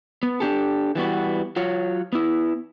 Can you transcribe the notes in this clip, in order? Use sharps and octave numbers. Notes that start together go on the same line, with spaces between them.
B3
D4 G4 A4
E3 G3 B3 F#4
F#3 F4 C#5
B3 E4